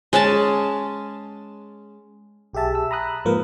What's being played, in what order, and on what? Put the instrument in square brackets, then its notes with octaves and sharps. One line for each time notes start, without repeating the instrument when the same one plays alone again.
[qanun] G#3 C#4 G#5 A5
[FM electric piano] B1 G4 G#4 E5 A5
E6
A#5 B5 D#6 F#6
G#2 F3 A#3 A#4 B4